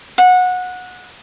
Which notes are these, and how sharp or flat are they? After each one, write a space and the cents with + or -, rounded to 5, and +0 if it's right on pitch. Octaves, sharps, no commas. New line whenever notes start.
F#5 -20